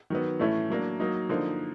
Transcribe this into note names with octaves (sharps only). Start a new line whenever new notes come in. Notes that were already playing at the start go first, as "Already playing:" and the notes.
D#3 F#3 B3
A2 E3 A3 C#4 E4
F#3 A#3 D4
F#3 A#3 D#4
D3 F3 A#3 D#4